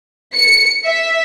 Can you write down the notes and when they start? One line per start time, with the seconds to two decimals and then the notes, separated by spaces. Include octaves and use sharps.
0.35 C#7
0.86 E5